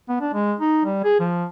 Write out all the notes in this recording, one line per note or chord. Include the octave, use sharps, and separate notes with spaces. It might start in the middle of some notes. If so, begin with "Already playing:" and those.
B3
D4
G#3
D#4
G3
G#4
F3